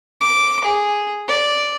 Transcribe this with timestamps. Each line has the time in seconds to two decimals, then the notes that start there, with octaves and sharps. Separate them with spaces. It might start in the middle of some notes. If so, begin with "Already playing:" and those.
0.21 D6
0.65 G#4
1.28 D5